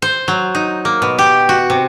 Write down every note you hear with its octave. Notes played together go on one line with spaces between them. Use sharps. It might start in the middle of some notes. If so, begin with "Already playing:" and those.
C5
F#3
D#4
A#3
B2
G4
F#4
C3